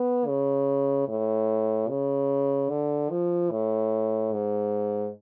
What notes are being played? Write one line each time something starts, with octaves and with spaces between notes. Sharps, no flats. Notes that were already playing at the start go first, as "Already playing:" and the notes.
Already playing: B3
C#3
A2
C#3
D3
F3
A2
G#2